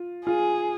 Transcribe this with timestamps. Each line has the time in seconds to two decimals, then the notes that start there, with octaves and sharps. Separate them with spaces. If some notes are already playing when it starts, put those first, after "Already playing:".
Already playing: F4
0.26 F4 G#4